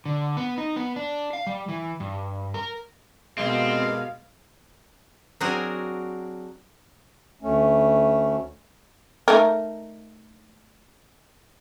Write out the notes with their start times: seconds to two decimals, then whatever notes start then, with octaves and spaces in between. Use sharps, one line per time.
0.05 D3
0.37 B3
0.58 D#4
0.76 B3
0.96 D4
1.33 F5
1.47 G3
1.69 E3
2.00 G2
2.54 A#4
3.38 G2 B2 G#3 A#3 C4 F5
5.40 F#3 C4 D4 F#4 G#4 A#4
7.42 D2 A3 C#4
9.28 A3 D#4 A#4